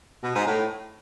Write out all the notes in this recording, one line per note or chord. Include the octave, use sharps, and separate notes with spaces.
B2
G#2
A2